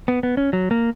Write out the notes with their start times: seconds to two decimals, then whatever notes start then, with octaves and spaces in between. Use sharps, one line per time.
0.08 B3
0.23 B3
0.37 C#4
0.53 F#3
0.71 A#3